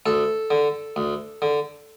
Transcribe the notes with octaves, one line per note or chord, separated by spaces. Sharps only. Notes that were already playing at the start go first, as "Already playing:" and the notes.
D2 A4
D3
D2
D3